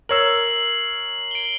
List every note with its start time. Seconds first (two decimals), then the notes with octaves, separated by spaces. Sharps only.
0.09 A#4 C#5 E6 C7 F#7
1.31 D7 G7